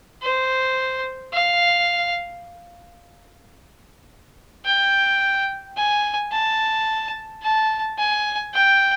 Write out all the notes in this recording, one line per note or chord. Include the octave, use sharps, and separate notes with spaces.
C5
F5
G5
G#5
A5
A5
G#5
G5